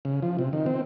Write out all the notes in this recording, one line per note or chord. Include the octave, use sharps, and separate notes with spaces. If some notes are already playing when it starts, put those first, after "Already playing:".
C#3
F3
C3
D#3
C4